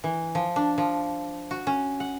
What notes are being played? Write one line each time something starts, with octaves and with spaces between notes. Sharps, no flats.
E3
F3
D4
F3
F#4
C#4
F#5